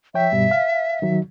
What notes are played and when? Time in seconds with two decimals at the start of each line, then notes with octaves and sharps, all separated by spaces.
0.14 F3 C#5 E5 G5
0.32 G2 B2 G3
0.51 F5
1.02 D#3 F#3